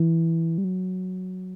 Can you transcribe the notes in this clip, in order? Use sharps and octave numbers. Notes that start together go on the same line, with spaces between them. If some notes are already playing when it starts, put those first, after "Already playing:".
Already playing: E3
G3
F#3